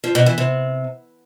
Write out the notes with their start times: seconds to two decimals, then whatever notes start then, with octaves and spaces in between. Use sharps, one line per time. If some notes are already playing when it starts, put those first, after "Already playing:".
0.04 F3
0.15 B2
0.26 E3
0.38 C3